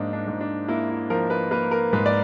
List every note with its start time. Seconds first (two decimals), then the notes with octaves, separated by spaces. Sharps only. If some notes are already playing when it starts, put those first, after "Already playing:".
Already playing: G#2 F3 A#3 D4 D#4
0.13 D4
0.27 G#2
0.41 D4
0.68 A#3 E4
0.89 E4
1.10 F3 A#4
1.30 B4
1.51 A#3 B4
1.71 A#4
1.93 G#2 B4
2.06 D5